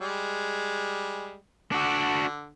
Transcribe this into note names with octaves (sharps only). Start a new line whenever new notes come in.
G3 G#3
D3 D4 F#4